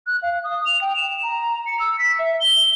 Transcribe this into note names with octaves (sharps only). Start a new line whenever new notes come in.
F#6
F5
D#6
F7
G5
E7
A#5
C#7
E6
B6
E5
G7